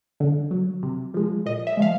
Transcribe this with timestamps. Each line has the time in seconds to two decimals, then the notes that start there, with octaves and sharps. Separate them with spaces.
0.20 D3
0.51 F#3
0.83 C3
1.14 F3 G#3
1.46 A#2 D#5
1.67 E5
1.77 F3 G#3 F5